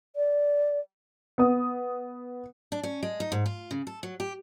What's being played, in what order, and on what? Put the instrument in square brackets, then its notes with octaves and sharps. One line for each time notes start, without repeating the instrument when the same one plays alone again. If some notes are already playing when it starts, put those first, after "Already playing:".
[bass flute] D5
[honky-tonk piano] B3 D#6
[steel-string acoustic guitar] D4
C#4
G#3
D#4
G#2
F4
C#3
A4
F#3
G4